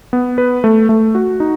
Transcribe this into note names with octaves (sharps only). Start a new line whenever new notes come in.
B3
B4
A3
A3
F#4
D#4